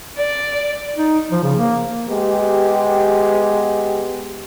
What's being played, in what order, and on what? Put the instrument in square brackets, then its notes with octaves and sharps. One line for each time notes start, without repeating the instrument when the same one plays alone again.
[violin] D5
[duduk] D#4
F3
C#3
A#3
[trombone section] G#3 B3 G4